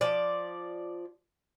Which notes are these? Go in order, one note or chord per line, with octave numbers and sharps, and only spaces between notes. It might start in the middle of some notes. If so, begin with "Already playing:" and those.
F3 D5